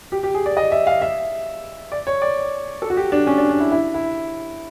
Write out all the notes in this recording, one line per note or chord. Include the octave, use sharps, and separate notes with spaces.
G4
G4
G#4
D5
D#5
E5
F5
E5
D5
C#5
D5
A4
F#4
G4
D4
C#4
D4
D4
E4
E4
E4